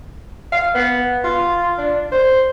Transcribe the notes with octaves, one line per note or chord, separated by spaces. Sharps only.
F5
B3
F4
D4
C5